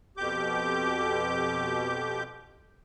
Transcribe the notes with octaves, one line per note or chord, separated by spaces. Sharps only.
F2 B2 G4 D6 G6